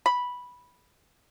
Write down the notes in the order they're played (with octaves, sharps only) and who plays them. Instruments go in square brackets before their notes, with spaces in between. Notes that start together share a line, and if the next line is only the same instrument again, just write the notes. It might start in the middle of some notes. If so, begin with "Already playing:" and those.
[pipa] B5